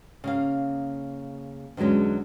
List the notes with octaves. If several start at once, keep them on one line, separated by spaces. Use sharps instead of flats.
C#3 A#3 F5
E2 D3 F#3 G#3 C#4